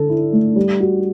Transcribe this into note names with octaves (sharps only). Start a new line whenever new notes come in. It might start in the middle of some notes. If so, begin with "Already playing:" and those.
Already playing: D3 A4
E4
A3
G3
F#4